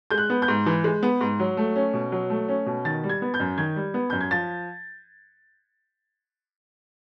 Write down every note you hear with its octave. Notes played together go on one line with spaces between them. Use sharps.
G#3 G6
F#6
B3
G6
G#2
E3
G#3
B3
G#2
F#3
A3
C#4
B2
F#3
A3
C#4
B2
D#3 A6
G3
G#6
B3
G6
F#2
D#3 G#6
G3
B3
F#2 G6
G#6
F3 A6